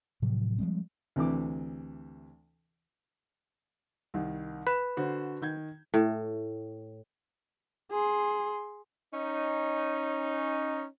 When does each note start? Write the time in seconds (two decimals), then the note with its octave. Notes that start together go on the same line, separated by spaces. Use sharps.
0.22 A2 C3 F3 F#3
0.58 F3 G3 G#3 C4
1.16 D2 C3 E3 D6
4.14 C2 D#3
4.67 B4 E7
4.97 D3 F#4 C5
5.42 D#3 G6 G#6
5.94 A2
7.91 G#4 C6
9.14 C#4 D#4